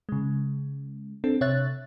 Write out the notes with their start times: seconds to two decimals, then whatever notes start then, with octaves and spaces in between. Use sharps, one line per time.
0.09 C#3 G#3
1.24 C4 D4 A4
1.41 C3 C#5 E5 F#6 A6